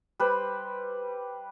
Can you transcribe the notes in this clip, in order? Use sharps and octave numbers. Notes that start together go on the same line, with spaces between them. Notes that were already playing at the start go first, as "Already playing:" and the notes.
G3 B4 C5